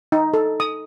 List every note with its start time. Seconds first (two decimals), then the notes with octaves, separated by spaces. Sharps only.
0.12 D#4
0.34 A4
0.60 D#6